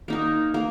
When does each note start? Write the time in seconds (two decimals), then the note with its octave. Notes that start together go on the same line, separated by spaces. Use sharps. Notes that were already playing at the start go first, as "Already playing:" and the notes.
0.08 A#3 D#4 A#4
0.54 A#3